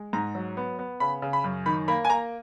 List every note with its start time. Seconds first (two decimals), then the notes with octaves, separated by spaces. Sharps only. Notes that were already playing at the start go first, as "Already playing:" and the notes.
Already playing: G#3
0.13 G#2 A#5
0.35 F#3
0.57 B3
0.79 B3
1.00 C#3 B5
1.22 C#3
1.33 B5
1.44 F#2
1.66 D#3 B5
1.88 A#3 B5
2.05 G#5
2.09 A#3 A#5